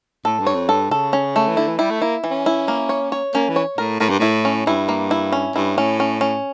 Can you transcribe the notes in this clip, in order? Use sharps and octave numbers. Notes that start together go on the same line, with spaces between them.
A2 A4
G2
C#5
F2
G2 A4
C#3 A4
C#4
A3
E3
D3 E4
E3
G3 E4
A3
A#3 E4
E3
C#4
E4
A#3
C#5
C#5
A#3 C#4
E3
C#5
A2 A#4
A2 A#4
G2
A2 E4
C#4
G2 E4
A#3
E4
C#4
G2 E4
A2 C#4
C#4
C#4